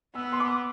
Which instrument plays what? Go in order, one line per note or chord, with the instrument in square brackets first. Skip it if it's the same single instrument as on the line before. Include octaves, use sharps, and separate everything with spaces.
[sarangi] B3 [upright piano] E6
[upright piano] C6
D6